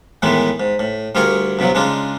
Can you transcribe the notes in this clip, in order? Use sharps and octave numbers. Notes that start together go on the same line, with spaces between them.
A2 D#3 E3 G#3 B3
G#2
A2
D2 G3 F4 G#4 A#4 C#6
G2 B2 F3 F#3
C#3 G#3 D4 D#4 F4